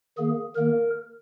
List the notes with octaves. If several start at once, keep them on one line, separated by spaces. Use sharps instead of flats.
D#3 A#3 G#4
D#3 A#3 A#4